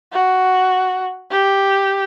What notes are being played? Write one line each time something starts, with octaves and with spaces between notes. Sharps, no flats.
F#4
G4